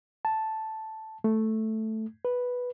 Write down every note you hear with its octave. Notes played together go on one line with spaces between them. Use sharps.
A5
A3
B4